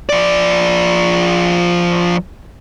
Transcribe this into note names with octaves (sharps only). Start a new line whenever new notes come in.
F3 D5